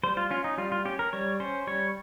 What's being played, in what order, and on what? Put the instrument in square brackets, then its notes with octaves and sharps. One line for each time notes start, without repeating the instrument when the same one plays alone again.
[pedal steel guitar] G3 C5
F4
C#4 F4
D#4
G3 F4
F4
C#4 G4
A#4
G3 C#5
C#4 C5
G3 C#5